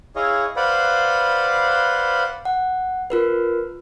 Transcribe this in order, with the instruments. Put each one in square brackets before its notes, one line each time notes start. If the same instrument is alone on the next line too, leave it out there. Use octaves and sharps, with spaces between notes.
[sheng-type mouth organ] E4 G#4 C#5 D#5 F5
B4 C5 D5 F5 F#5 B5
[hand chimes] F#5
F4 A#4 B4